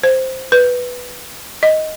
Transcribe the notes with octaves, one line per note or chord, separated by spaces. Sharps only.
C5
B4
D#5